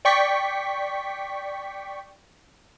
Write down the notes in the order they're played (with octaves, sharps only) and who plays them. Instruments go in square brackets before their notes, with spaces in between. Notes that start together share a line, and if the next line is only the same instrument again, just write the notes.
[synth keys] D5 G5 C#6 B6